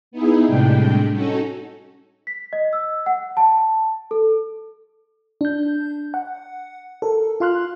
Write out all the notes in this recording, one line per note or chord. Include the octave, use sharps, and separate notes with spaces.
B3 D#4 E4 G#4
A2 C3 G3 G#3 D4 G5
C#4 D#4 F#4 A4
B6
D#5
E6
F#5
A5
A4
D4 G6
F#5
A4 A#4
F4 F5 C6 F6 F#6